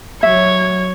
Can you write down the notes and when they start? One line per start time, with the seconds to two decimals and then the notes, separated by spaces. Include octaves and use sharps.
0.23 F#3 C#5 E5 G#6